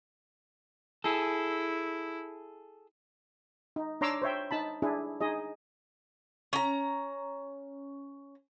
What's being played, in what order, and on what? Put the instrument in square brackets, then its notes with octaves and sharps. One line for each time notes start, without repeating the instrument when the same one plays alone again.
[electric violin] E4 [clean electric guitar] G#4 A4
[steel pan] D#4
D4 C#5 A#5 C6 D6 E6
C5 C#5 E5 G5
D#4 A5 B5
D4 E4 G#4
D#4 G#4 D#5
[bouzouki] C#4 A#5